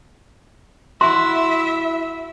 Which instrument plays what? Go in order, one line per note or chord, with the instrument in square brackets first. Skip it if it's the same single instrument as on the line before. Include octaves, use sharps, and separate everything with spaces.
[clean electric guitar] E4 F#4 [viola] E5 [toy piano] C6